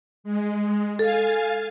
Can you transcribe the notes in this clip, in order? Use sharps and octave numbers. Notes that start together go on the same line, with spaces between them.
G#3
A4 F5 G#5 A6